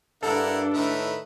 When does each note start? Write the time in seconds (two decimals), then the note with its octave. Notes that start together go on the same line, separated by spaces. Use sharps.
0.23 G2 D4 E4 A4 A#4 F#5
0.74 A2 D#3 B4 E5